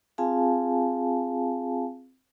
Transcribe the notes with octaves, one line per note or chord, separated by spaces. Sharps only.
C4 F4 G#4 F5 G#5 A5